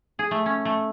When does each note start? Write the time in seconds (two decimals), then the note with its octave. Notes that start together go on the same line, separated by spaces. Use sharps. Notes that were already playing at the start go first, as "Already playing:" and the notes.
0.19 G#4
0.31 A3
0.46 C#4
0.65 A3